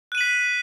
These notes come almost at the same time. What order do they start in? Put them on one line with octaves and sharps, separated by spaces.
F#6 D#7 F#7 B6